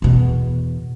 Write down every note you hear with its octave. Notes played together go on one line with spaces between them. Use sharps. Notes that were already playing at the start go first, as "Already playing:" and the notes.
E2 B2